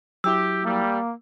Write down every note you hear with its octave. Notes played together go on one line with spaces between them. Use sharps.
F#3 E4 G4 D6 E6
G3 A#3